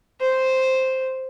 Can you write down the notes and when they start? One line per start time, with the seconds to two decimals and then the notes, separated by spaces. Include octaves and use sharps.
0.21 C5